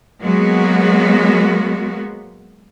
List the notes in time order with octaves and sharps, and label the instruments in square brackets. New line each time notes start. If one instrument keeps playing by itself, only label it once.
[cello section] F#3 G#3 A#3 B3 F#4